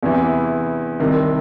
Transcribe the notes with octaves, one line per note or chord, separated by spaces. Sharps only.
E2 C3 E3
C2 C3 D#3